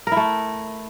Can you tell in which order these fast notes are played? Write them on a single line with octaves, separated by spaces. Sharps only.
A#4 E4 A3